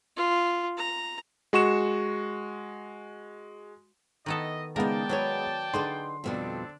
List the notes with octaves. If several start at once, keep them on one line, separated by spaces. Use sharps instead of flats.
F4
A#5
G#3 F#4 C#6 E7
D#3 B3 E4 A4 D#5
C#3 G#3 B3 D#4 A#4 D5 G5 A5
F#3 F#4 B4 C#5
D3 D#4 G#4 B4 C6
F2 B2 G3 C4 D4 A4